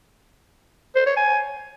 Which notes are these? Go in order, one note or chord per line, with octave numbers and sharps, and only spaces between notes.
C5
C#5
G#5